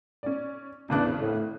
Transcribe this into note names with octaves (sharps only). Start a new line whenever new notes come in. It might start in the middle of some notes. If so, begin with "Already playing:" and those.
C#4 D5
G#1 E2 C#3 D4 F#6
A2